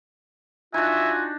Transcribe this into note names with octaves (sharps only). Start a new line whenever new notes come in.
D4 D#4 F4 F#4 E5 G#5